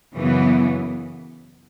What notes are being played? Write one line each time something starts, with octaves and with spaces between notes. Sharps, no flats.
F#2 C#3 E3 B3